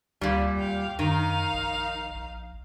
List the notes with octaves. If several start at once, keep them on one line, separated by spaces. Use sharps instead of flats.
D2 A#2 G3
D#2 F5 G5
F#2 D#3 D#4 F5
A#1
A#1